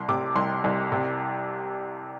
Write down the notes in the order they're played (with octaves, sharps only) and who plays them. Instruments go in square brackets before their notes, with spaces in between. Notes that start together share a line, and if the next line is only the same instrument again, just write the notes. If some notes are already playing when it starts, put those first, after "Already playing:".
Already playing: [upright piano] C2 C6
C3 D6
C2 C6
C2
C3